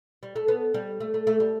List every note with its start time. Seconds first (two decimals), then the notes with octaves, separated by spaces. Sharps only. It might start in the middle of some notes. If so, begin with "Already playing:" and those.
0.23 G3
0.36 A3
0.48 B3
0.74 G3
1.00 A3
1.14 A3
1.27 A3
1.40 G3